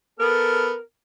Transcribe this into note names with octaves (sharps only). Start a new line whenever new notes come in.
B3 A4 A#4 F6